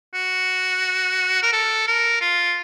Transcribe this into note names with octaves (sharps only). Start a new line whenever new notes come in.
F#4
A#4
A4
A#4
F4